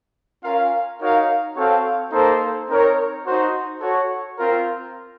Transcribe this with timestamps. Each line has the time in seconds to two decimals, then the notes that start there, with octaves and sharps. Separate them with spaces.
0.44 C#4 F4 A#4 F5
1.01 D#4 F#4 A#4 C#5 F5
1.56 C4 F#4 A4 C#5 F5
2.12 A#3 D#4 A4 C5
2.69 C4 D#4 A#4 C#5
3.25 D#4 F#4 C5
3.81 F#4 A4 C#5
4.37 C4 F4 A#4